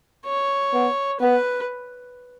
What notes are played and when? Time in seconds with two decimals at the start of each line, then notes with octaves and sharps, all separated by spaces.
0.25 C#5
0.73 B3
1.20 B3 B4